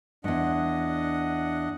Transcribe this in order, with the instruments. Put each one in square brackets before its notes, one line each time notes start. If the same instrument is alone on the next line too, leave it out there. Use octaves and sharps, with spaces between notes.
[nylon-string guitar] E2 G2 [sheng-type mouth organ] D4 D#5 F#5